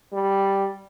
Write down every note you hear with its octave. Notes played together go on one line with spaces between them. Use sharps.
G3